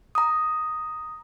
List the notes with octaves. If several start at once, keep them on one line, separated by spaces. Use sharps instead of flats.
A#5 D#6